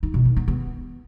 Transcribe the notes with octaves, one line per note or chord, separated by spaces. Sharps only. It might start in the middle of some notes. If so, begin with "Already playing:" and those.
D#4
B2
D#3
B3
B3